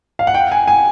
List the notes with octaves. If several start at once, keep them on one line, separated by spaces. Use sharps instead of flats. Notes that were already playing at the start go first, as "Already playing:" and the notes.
F5
F#5
G5
G#5
G#5